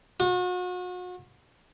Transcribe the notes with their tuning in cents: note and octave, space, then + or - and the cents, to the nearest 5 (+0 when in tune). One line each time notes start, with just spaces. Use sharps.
F#4 -40